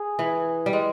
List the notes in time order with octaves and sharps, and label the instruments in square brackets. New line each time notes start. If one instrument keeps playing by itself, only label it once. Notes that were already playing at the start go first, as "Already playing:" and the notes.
Already playing: [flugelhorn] G#4
[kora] E3
G3
G#3